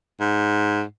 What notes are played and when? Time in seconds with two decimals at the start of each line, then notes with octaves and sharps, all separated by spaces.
0.20 G#2